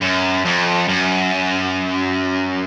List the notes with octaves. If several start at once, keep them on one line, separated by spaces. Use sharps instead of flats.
F#2
F2
F#2